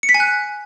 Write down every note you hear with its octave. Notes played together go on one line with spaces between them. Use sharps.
C#7
B6
G#5
F#6